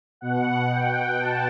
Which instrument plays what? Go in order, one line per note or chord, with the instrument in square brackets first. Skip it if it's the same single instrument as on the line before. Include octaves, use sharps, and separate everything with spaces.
[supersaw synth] B2 F#5
G5
A5